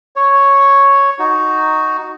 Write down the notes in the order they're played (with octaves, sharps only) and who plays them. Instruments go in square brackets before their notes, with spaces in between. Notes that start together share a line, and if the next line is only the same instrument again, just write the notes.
[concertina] C#5
D#4 F#4